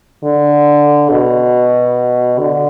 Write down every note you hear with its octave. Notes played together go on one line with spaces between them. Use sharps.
D3
B2
D3